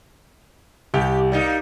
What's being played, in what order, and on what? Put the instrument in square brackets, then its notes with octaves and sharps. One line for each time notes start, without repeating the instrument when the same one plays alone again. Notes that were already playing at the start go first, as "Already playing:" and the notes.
[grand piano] C2 [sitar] G4
[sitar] G3 A#3 D#4